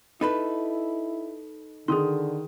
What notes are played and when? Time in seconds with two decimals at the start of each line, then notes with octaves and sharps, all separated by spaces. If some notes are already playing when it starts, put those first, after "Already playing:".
0.21 D#4 E4 A4 B4 B5
1.88 D3 D#3 G#4 C6 D#6